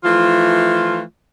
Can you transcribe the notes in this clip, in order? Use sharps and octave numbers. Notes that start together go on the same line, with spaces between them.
E3 F3 A3 F4